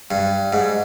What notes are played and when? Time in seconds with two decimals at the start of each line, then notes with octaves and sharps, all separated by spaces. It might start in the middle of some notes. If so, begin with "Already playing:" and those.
0.11 G2
0.53 G#2